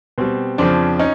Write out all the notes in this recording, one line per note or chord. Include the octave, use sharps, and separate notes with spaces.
B2 G3 C4
F2 C#3 F3 C4 D4
C#4 D#4